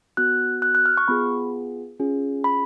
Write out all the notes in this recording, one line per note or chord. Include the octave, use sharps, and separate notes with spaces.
B3 F#4 F#6
F#6
F#6
F6
C#6
B3 F4 G#4 B5
C#4 F4 G#4
B5